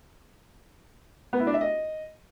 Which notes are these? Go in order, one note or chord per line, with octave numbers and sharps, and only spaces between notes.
B3
E4
D4
E5
D#5